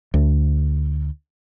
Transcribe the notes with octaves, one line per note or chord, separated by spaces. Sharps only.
D2